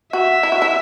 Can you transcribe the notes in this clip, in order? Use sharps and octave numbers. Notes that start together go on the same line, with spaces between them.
F#4 E5
E4
F#4
E4